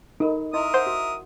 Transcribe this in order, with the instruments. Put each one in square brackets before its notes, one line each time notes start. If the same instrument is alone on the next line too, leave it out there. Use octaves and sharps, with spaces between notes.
[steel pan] D#4 [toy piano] A4 A#4 B5
[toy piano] E4 D#5 C6 [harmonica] A#4 E5 D#6
[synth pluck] C5 [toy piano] F#5
[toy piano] F#4